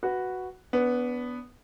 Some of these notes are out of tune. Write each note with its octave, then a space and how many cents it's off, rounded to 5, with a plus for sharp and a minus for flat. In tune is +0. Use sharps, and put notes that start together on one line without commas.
F#4 +0 B4 +0
B3 +0 D4 -30